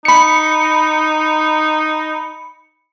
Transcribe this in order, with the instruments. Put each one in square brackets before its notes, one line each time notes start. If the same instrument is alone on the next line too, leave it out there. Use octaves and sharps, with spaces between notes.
[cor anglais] D#4 [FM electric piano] B5 C#7